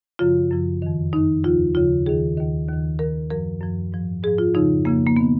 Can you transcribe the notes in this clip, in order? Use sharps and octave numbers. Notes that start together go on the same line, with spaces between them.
F#2 C#3 F3 F4
F#2 C#3 F3
F2 D#3
F2 D#3 D#4
D#2 C#3 F3 F4
D#2 C#3 F3 F4
D#2 D#3 G#4
D#2 D#3
D#2
D#3
D#2 D#3 A#4
F#2 F3 A#4
F#2 F3
G#2 F3
G#2 F3 G#4
F4
F2 C#3 F3 D#4
F2 C#3 F3 A#3
A#3
D#3 B3